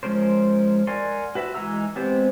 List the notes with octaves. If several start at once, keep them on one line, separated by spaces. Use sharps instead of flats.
F3 G#3 C#4 A#4 C5
A#4 D5 F#5 G#5 C6
F#4 B4 E5
E3 G#3 D#4 A#5 E6
G#3 B3 C4 G4 C5